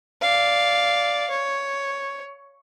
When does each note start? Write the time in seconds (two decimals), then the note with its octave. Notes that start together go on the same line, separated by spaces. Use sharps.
0.22 D5 F5
1.30 C#5